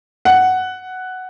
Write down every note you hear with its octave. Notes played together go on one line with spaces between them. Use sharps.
F#5